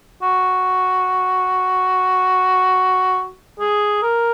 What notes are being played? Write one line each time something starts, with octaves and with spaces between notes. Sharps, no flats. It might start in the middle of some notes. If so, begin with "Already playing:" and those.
F#4
G#4
A#4